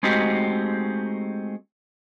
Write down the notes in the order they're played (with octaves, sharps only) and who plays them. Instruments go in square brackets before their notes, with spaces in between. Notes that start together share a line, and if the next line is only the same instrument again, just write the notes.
[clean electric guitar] G#3 A3 C4 D#4 F#4 G4